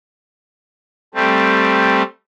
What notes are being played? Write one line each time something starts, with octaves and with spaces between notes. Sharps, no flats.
G3 A3 C4